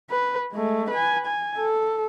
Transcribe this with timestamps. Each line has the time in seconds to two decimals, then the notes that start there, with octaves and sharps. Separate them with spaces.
0.10 B4
0.53 G#3 A3
0.90 B4 G#5
1.26 G#5
1.58 A4